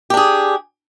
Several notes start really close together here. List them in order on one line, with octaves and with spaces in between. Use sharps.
G4 D4 G#4